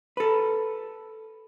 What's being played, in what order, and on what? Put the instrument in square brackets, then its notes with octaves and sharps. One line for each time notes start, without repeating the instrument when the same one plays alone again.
[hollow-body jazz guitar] A4 B4